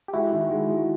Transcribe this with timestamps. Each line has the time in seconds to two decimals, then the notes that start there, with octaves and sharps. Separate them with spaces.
0.08 G4
0.13 G#3 E4 F#4
0.32 D#3
0.50 G#3
0.69 G#3